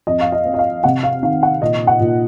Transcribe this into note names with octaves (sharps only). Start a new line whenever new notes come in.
F2 D#5
F5
D#5
C4
D#5
F5
C3 F#5
F5
D#3 F5
F#5
A#2 D#5
F#5
A#2